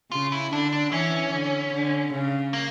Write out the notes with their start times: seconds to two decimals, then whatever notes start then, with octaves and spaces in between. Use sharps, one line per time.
0.12 C#3 F4
0.32 E4
0.52 D3 D4
0.72 D4
0.92 E3 C#4
1.33 D3
1.73 D3
2.13 C#3
2.53 A#3